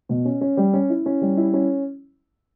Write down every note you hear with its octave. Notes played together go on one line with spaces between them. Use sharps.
B2
C#4
C#4
G3
C#4
E4
C#4
G3
E4
C#4